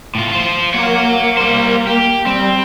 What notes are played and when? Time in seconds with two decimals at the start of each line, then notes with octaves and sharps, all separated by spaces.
0.15 A2 F4
0.32 F4 C5
0.74 A#3 C#5 F#5
1.37 G3 C5
1.87 G4
2.26 G3 C4